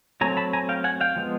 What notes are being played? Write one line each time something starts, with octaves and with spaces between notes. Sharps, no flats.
F#3 A3 C4 G#5 A#5
A5 B5
G#5 A#5
F5 G5
F#5 G#5
F5 G5
F3 G#3 B3